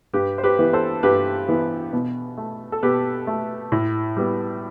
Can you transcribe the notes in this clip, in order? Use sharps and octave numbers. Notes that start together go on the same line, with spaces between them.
G2 G4 B4
C5
G4 B4
E3 B3
A4 C5
G2 G4 B4
E3 B3
B2
A3
A4
B2 G4 B4
A3
A2
G3 B3